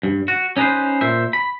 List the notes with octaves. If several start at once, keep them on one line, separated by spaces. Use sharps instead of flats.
G2
F#4
C#4 D#4 G4 B4 C5
A#2 C5 E5
B5